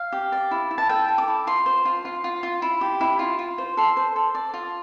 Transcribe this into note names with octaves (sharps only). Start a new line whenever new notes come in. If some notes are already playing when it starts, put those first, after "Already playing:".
Already playing: F5
G4
D5
E4
E4
A5
A4 G5
A4
D6
E4
F4 C6
C5
F4
F4
F4
F4
E4
G4
E4
F4
F4
C5
A4 C6
C5
A4
D5
F4